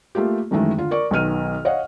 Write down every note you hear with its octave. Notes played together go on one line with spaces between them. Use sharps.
A3 A#3 F4 G4
F#2 D#3 E3 G#3 A3
D3 F4
A#4 D5 C#6
B1 D#3 B3 F6 D#7
C#5 D#5 F5 F#5